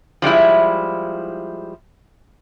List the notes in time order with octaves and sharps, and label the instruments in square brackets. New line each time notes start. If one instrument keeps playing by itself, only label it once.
[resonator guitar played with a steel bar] F3 G3 G#3 E4